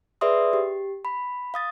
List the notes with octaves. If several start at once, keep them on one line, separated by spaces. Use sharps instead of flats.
G#4 B4 D5 E5 C6 D#6
G4
B5
F5 D#6 A6